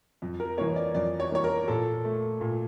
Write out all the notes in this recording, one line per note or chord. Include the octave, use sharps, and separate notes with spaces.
F2
A#4
E3 A#3 C#5
D5
F2 D5
C#5
E3 A#3 C#5
A#4
A#2 A4
A3
A#2